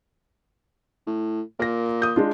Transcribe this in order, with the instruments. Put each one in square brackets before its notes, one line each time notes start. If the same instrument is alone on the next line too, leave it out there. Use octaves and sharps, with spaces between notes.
[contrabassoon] A2
[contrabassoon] A#2 [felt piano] A#4 A#6
[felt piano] D#6 G6
G#3 D4 F4